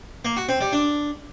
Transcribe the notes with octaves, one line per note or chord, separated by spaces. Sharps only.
A#3
F#4
C4
G3
D4